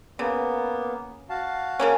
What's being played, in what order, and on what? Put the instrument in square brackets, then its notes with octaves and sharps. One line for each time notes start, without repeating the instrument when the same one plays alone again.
[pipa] C#3 [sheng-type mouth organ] A#3 B3
[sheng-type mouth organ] F#4 F5 A5
[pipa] C#3 A#3 C#4